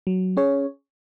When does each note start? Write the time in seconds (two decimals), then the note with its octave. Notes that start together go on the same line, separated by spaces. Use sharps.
0.07 F#3
0.37 C#4 G#4 C#5